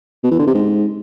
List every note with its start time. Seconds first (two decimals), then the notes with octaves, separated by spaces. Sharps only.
0.24 B2
0.31 E3
0.39 D3
0.47 C3
0.55 G#2